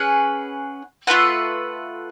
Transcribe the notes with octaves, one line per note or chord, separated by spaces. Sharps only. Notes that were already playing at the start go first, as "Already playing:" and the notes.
Already playing: C#4 G#4 B4 F#5
A3 F4 B4 F#5